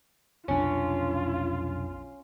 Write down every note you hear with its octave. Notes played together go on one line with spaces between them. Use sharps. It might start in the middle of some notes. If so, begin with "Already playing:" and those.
F1 B1 C#4 D4 F4